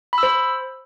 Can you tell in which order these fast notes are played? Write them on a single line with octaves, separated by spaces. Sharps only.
B5 E6 C5